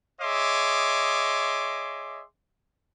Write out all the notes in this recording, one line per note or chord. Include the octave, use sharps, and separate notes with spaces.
G#4 C#5 D#5 E5 C6 D6